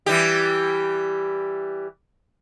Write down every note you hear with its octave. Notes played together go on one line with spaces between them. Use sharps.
E3 G3 G4